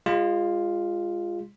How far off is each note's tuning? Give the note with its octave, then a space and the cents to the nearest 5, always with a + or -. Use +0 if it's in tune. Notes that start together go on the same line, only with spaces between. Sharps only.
G#3 -25 F4 +0